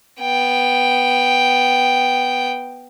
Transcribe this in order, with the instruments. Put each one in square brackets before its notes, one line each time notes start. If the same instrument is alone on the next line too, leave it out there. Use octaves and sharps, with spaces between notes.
[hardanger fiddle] B3 G5